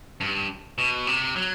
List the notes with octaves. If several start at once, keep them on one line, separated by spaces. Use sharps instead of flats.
G2
B2
C3
F#3